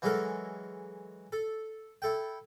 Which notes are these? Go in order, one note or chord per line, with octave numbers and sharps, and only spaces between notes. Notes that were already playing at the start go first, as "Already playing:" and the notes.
E3 F#3 G#3 A4 A#4
A4
E4 A4 G5